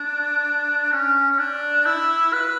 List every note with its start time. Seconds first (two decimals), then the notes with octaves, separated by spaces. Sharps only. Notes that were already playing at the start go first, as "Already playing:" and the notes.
Already playing: D4
0.92 C#4
1.31 C#4
1.38 D4
1.86 E4
2.33 B4